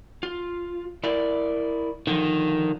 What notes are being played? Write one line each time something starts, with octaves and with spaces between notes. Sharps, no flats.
F4
E4 A#4 D5
D3 D#3 F3